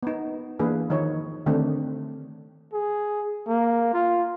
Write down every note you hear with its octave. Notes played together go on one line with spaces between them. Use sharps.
B3 D#4
E3 A#3 D4 G#4 B4
D#3 F3 D#4 C#5
D3 D#3 A3 C4 D4
G#4
A#3
F4